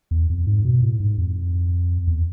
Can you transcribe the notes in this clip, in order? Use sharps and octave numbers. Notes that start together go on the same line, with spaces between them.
E2
F2
G#2
B2
A2
G#2
F2
E2